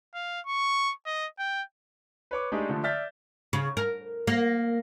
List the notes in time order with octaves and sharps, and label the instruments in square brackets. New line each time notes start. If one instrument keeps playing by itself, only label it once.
[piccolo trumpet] F5
C#6
D#5
G5
[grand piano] B4 C#5 D6
G#3 A3 D4 D#4 G4 G#4
D3 F3 A3
D5 E5 F6 G6 A6 B6
[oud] C#3
A#4
A#3